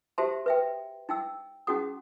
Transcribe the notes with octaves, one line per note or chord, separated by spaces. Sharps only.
F#4 G4 C5 E5 A5 C6
B4 E5 G5
D#4 G5 E6
C#4 D#4 F#4 G#4 F#5 D#6